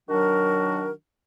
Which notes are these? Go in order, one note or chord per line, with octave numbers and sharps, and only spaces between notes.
D#3 F#3 D4 F#4 A#4